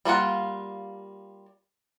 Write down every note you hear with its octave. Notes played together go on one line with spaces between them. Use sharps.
G3 A#3 F4 F#5